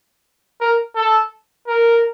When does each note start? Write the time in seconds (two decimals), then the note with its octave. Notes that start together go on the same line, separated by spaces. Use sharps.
0.61 A#4
0.96 A4
1.67 A#4